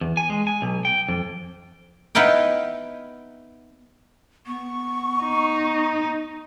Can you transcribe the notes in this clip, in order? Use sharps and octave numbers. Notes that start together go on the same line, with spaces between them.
E2
G#5
G#3
G#5
B1
G5
F2
B3 D#4 E4 F5 G5
B3 C#6
D#4